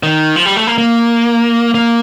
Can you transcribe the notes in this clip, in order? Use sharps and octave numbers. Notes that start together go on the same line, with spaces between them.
D#3
F3
G3
A3
A#3
A#3
A#3